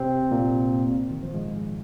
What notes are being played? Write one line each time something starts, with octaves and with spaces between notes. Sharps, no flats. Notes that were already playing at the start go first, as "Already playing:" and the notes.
Already playing: C3 C4
A#2 A#3
D#3
F3
G#2 G#3